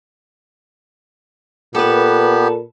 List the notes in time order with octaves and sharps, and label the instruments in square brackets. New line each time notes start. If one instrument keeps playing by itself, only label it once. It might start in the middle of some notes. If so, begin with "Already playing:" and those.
[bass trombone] A#2 [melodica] B3 G4 [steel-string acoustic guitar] A4 B4